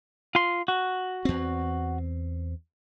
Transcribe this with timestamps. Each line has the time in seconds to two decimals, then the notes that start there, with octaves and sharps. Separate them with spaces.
0.35 F4 C6
0.68 F#4
1.25 E2 C4